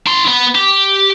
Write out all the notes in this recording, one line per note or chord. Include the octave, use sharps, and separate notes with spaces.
E4 C6
B3
G4